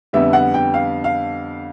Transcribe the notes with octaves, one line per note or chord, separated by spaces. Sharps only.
F2 D3 G3 B3 E5
F#5
G5
F5
F5